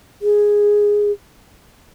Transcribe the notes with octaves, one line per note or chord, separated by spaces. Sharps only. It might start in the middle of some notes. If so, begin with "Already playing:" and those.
G#4